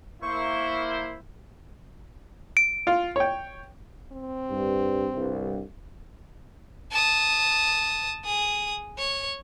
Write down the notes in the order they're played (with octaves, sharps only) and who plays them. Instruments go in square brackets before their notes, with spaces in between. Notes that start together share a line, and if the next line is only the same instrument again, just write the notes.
[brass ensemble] A#3 E4 C5 [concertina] C#6
[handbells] D7
[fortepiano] F4
C#5 G5
[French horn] C4
[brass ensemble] G2
C2 G2
[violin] A5 D#6
G#4 D#6
C#5